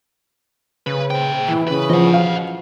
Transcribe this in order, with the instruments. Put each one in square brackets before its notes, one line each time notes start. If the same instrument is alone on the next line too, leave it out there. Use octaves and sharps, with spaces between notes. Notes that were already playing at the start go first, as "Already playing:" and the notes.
[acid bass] C#3 [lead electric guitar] B4
[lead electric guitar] A#2 G5 [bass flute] C5
[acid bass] E3 [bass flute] E4
[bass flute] C#3 [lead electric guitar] B4
[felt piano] F3 [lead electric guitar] D#5 F#5
[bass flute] F#3 [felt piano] F5